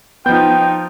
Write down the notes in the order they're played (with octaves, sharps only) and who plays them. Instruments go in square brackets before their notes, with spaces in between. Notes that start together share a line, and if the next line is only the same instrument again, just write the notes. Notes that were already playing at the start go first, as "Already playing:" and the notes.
[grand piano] F3 G6 [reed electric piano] B3 [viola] D#4 F4 [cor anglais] G5